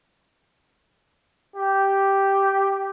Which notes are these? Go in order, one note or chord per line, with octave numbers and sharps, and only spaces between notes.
G4